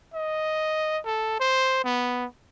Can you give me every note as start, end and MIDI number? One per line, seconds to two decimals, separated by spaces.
0.14 0.99 75
1.05 1.37 69
1.40 1.83 72
1.84 2.26 59